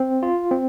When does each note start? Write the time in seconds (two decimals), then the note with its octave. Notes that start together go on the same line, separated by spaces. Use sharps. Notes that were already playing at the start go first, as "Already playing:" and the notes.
Already playing: C4
0.23 F4
0.51 C4